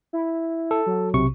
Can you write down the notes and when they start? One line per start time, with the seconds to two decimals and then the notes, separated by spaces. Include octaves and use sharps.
0.13 E4
0.71 A4
0.86 F#3
1.14 B1 C3 C#6